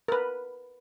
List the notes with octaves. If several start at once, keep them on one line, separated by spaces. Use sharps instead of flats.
A#4 B4